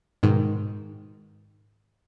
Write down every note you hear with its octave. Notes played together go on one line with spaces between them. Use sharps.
G#2 B2 D#3 G#3